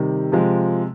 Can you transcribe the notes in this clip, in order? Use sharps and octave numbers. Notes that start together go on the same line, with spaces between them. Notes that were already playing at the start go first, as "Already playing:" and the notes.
Already playing: C3 D#3 G3
C3 F3 G#3